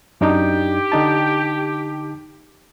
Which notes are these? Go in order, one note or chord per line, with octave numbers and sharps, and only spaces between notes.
F#2 D4 D#4 G4
D3 D#4 A5